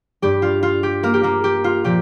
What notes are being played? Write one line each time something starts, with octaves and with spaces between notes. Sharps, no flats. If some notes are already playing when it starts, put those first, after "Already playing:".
G2 G3 G4
F4
F4
G4
A#3 A#4
G4
A#3 A#4
G4
F4
A#2 F3 G4